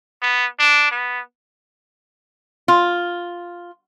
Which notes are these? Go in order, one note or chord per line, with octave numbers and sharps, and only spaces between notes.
B3
D4
B3
F4